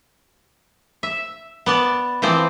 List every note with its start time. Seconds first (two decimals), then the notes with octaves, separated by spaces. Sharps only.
1.03 E5
1.66 B3 D5 A5
2.22 E3 F3 C4 C5 D5